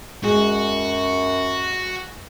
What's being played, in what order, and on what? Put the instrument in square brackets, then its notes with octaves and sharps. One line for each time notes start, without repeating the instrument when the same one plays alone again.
[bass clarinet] F#2 [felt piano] G#3 [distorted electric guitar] F#4